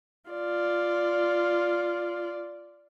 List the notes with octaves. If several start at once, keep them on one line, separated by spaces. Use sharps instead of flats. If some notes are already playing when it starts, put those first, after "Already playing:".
F4 D5